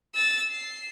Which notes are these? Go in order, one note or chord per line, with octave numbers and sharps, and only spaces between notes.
E6 A6
C7